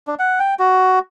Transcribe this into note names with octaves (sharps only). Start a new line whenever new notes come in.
D4
F#5
G5
F#4